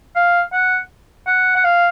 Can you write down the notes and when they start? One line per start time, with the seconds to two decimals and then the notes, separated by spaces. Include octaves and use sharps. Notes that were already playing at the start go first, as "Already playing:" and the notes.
0.15 F5
0.53 F#5
1.27 F#5
1.56 F#5
1.64 F5